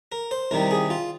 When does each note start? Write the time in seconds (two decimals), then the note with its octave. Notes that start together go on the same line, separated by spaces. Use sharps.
0.12 A#4
0.31 C5
0.51 C2 C3 D#3 G3 A#4
0.71 G#4
0.90 F4